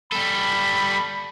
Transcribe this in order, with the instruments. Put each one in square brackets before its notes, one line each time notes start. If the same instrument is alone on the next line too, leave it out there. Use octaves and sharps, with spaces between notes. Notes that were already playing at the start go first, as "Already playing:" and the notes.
[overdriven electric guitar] G3 A4 [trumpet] B5